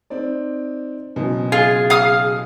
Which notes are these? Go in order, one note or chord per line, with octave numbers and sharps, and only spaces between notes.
C4 D#4 D5
F#1 B2 C#4
F4 G#4
F5 D#6 F6